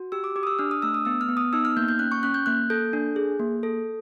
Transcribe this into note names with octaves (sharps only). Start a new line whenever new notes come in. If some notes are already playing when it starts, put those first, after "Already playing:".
Already playing: F#4
G4 E6
D6
G4 D6
D#6
E6
D4 F6
D#6
A3 E6
D#6
B3 E6
F6
B3
D#6
D#4 E6
F6
A#3 G6
G6
C#4 F#6
C#6
C#4 F#6
G6
A#3 F#6
A4 G6
D4
G#4
A#3
A4